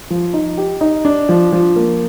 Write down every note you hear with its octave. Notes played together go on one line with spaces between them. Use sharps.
F3
D#4
G4
D#4
D4
F3
F3
A#3